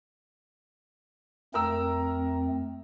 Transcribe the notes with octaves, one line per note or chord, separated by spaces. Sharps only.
F2 A3 C4 A#4 A#5 E6